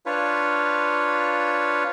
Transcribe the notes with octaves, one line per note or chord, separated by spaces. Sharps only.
D4 F4 B4 C#5